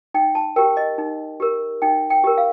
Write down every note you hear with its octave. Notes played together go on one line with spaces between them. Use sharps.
D#4 G5
A5
G4 A#4 G5
D#5
D#4
G4 A#4
D#4 G5
G5
G4 A#4
F5